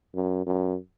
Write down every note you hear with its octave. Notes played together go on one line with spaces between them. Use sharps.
F#2
F#2